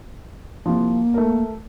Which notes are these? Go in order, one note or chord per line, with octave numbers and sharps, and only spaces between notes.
C2 F3 A#3
A3 A#4